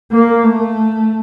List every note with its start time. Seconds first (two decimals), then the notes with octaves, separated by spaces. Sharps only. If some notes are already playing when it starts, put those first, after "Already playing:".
0.12 A#3
0.44 A3